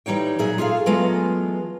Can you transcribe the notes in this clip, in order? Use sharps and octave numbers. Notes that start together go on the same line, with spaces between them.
E3 G3 D#4 C#5 G5
A#2 F#3 G#4 E5
F4 G#4 A4 E5 F5
E3 F#3 G#3 A3 B3 F4